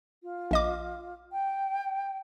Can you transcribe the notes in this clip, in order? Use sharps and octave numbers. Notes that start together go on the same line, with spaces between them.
F4
A#1 D#5 D6
G5